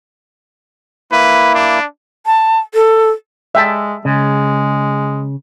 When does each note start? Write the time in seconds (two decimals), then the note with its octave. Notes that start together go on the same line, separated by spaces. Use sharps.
1.12 A#3 E4 B4
1.54 D4
2.26 A5
2.74 A4
3.55 G#3 E5 G5 A5
4.05 C#3 G#3